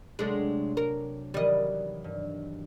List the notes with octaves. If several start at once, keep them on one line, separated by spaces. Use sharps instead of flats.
C3 F#3 G#3 A3 D4
A#4
D#3 E3 F#3 G3 D#5
G2